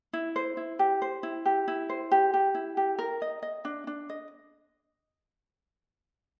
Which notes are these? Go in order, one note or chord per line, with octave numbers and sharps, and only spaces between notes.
E4
C5
E4
G4
C5
E4
G4
E4
C5
G4
G4
E4
G4
A#4
D#5
D#5
D4
D4
D#5